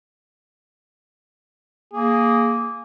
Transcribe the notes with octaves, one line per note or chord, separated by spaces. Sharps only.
A#3 G#4